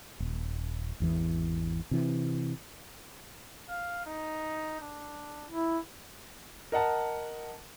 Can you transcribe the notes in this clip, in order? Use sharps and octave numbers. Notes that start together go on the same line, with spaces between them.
D#1
G#1 E2 E3
C3 E3
F5
D#4
D4
E4
A#4 D#5 F#5 A5